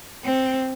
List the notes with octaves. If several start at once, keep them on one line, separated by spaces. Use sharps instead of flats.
C4